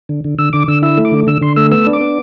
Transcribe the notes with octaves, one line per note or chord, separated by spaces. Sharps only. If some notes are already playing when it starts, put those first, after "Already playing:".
D3
D3
D3 E6
D3 D6
D3 E6
E4 E6
A3
D6
D3
D3 E6
D3 C6
A3 E6
B3 E6
D4
D6
B3